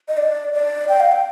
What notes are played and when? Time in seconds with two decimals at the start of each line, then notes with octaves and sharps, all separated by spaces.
0.08 D#5
0.17 D5
0.53 D5
0.89 G5
1.00 F5
1.12 G5